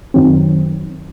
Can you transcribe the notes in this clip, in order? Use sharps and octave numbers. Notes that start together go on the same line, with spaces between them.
F#2 D#3 F#3 C4